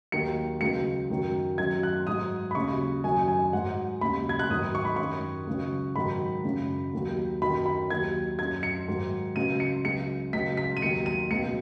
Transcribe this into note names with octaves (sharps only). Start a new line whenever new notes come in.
D#2 D#3 F#3 C#7
C#2 C#3 F#3 C#7
F#2 D#3 F#3
F#2 D#3 F#3 G#6
F#6
G#2 F#3 D#6
B5
D#2 C#3 F#3 C#6
F#2 D#3 F#3 G#5
G#5
G#2 F#3 F#5
D#2 C#3 F#3 B5
G#6
F#6
G#2 D#3 F#3 D#6
C#6
B5
F#2 D#3 F#3 C#6
C#2 C#3 F#3
G#2 D#3 F#3 B5
F#2 C#3 F#3
D#2 D#3 F#3
F#2 D#3 F#3 B5
B5
D#2 D#3 F#3 G#6
F#2 F#3 G#6
C#7
G#2 D#3 F#3
C#2 C#3 F#3 D#7
C#7
C#2 C#3 F#3 C#7
C#2 C#3 F#3 B6
B6
D#7
D#2 D#3 F#3 C#7
D#7
C#2 B2 F#3 C#7